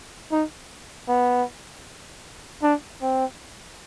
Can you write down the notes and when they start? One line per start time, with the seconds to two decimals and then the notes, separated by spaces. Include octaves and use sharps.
0.32 D#4
1.08 B3
2.63 D4
3.02 C4